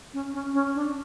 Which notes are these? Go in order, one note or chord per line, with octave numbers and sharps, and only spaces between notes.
C#4
C#4
C#4
D4